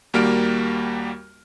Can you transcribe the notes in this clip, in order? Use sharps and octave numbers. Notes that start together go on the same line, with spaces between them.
D#2 G3 A#3 F#4 F6 D7